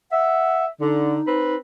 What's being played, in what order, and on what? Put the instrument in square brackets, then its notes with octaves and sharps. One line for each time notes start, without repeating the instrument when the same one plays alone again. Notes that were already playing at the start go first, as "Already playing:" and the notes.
[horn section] E5 [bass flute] F#5
[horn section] D3 [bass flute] D#4
[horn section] C4 B4